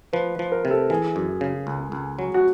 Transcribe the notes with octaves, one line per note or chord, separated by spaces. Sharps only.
F3 B4
F3
A#4
C3
A4
E3 G#4
F#2
C#3
C#2
C#2
F#3
F#4